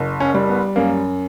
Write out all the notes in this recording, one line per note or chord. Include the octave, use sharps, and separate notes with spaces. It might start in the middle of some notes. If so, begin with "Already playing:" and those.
Already playing: F#1
C#4
G3
B3
F#2 A#3